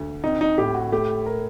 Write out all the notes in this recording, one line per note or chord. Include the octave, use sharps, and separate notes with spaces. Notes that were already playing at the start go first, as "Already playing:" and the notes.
Already playing: D2
C4 D#4
D#4
A2 G4
F#4
A3 G4
A#4